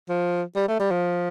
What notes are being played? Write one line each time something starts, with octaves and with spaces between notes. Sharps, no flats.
F3
G3
A3
G3
F3